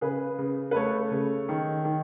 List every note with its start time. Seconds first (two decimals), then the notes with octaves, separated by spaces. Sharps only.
0.01 C#3 G#4 B4
0.38 C#3
0.71 B4
0.75 A3 A4 C#5
1.11 C#3
1.49 D#3
1.85 D#3